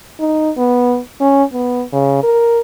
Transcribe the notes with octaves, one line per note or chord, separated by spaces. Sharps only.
D#4
B3
C#4
B3
C#3
A#4